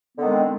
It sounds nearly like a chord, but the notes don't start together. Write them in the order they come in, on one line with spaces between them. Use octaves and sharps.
B3 D3 D#3 G#3 C4